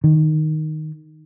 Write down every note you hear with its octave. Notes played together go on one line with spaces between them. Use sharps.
D#3